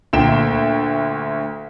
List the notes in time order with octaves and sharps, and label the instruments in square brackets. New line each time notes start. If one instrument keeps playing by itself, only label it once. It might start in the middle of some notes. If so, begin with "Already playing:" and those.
[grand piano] D2 A#2 G5 E7